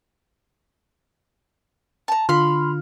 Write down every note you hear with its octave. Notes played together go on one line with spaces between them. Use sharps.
A5 A#5
D3 F4 B5 C6 F6